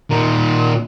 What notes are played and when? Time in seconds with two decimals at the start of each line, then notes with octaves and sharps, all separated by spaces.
0.10 A#2 D#3